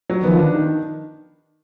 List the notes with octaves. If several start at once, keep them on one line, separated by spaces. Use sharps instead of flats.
F#3
D#3 F3 B3
D4
D#3